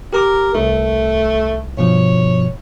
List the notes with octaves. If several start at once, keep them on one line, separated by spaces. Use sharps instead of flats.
G4 A#4 A#5 D6
C2 A3 E4
G2 B2 F3 C#5